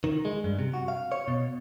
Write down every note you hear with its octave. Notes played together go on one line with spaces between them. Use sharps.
D#3
G#3
G2
C3
F#4
F5
C#5
B2